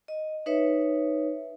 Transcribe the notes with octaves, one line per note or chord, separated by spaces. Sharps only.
D#5
D#4 B4 C#5 E5